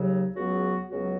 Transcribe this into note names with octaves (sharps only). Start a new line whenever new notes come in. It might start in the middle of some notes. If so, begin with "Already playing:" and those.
Already playing: D#2 C#3 F#3
C#2 C#3 F#3 B3 F#4
C#2 C#3 F#3 B3 F#4